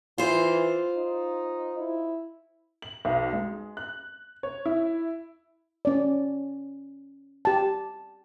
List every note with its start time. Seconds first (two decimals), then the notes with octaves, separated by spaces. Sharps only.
0.18 E3 F4 C5
0.96 D#4
1.78 E4
2.82 F#7
3.05 B1
3.33 G#3
3.77 F#6
4.43 C#5
4.66 E4
5.85 C#4 D5
7.45 G4 A5